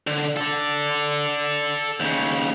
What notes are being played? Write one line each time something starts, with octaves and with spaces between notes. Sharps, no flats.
D3
A4 D5
D#2 C#3